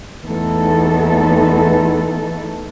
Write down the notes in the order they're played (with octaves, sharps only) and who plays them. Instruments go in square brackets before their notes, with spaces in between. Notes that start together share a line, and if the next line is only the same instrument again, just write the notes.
[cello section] E2 E3 A3 D#4 A4